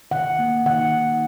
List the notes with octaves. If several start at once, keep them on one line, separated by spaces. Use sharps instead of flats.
D#3 F#5
A#3
D#3 F#5